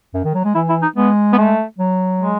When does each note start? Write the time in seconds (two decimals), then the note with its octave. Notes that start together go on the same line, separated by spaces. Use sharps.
0.14 F#2
0.24 D#3
0.34 F#3
0.44 G#3
0.55 E3 E4
0.69 E4
0.82 D#4
0.96 G#3 B3
1.33 B3
1.38 A3
1.78 F#3
2.19 G#3